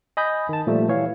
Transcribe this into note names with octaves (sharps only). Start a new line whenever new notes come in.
D#5 G#5 B5 D#6 G6
D#3 A5
A#2 F3 G3 A3
E3 C#5 F5